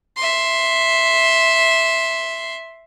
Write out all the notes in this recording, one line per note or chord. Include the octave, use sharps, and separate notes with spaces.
E5 C6